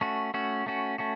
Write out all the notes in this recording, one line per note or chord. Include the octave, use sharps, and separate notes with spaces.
A3 C#4 F#4
A3 C#4 F#4
A3 C#4 F#4
A3 C#4 F#4